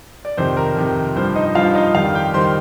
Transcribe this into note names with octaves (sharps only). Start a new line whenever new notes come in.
D5
F2 C3 D#3 C5
A#4
F2 C3 D#3
G2 F3 C5
D#4 D#5
G2 F3 F4 F5
D#4 D#5
F2 D#3 G3 F4 F5
G4 G5
D#3 G3 C5 C6